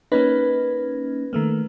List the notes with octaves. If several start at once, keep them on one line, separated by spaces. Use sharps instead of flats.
A#3 C#4 D#4 B4
D#3 A3 A#3